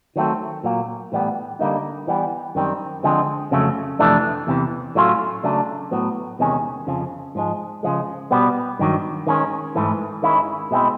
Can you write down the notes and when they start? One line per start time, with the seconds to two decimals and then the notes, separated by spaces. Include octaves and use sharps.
0.16 D#3 F#3 A3 C4
0.64 A#2 F#3 A#3
1.12 A2 E3 G3 B3
1.59 D3 G3 A#3 D#4
2.07 E3 G3 B3
2.55 F#2 D#3 G3 C4
3.03 D3 F3 G#3 C4
3.51 F2 C#3 F#3 A3
3.99 F2 C3 E3 A3 D4
4.47 E2 C3 E3
4.95 A2 F#3 A3 C#4 F4
5.43 C#3 F#3 A3 D4
5.91 A2 F#3 B3
6.39 E2 C3 D#3 G#3 C#4
6.87 F2 C#3 F3
7.35 G#2 F3 G#3
7.83 C#3 F3 G#3
8.31 B2 G3 B3
8.79 G2 D#3 F#3
9.27 D#3 G#3 C#4
9.75 G#2 E3 A3
10.22 D#3 G#3 C#4 E4
10.71 B2 G#3 C4 E4